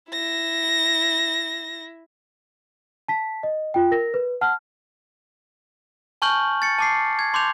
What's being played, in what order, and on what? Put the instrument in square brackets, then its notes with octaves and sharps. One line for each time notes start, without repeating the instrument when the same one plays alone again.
[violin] E4 A#6
[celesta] A5 B6
D#5
F4 G5
A#4 A#6
B4
F#5 A5 F6
[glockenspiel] G#5 A5 C#6 F6 G6 F#7
A6 C#7
A5 D6 C7
G#6
A5 C6 D6 G6 F7